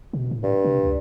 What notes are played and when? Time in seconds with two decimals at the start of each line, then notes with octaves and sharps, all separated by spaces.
0.13 B2
0.31 A2
0.43 G2
0.64 C3
0.83 C#2